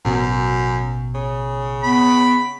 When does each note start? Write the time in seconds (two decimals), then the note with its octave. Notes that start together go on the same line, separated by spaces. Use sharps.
0.05 A1 F#2 B2
1.15 C#3
1.83 B3 B5